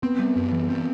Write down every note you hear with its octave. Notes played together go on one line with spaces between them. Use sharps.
B3 C4
G3
F#2
E3
C4